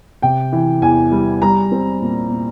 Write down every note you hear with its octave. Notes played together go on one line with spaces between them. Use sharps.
C3 G5
E3
E2 G#5
G3
G3 A#5
C4
A#2
A#2